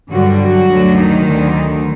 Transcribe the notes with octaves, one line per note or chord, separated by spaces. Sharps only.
G2 D3 F#3 G3 F#4
F#3 F#4
D2 D3 F#3
D#3 D#4
D2 D3 F#3